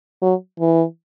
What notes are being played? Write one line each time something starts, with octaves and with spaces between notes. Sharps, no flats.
F#3
E3